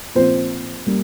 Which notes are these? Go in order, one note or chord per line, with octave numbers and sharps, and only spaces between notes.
A#2 F3 C4 C5
G3 A#3